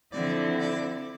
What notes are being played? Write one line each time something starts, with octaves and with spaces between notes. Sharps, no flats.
D3 F3 C4 E4 D5
D5